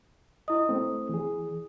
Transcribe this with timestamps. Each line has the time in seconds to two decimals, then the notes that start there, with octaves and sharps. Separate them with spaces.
0.48 E4 D#5 D#6
0.69 A3 C4
1.09 E3 G#4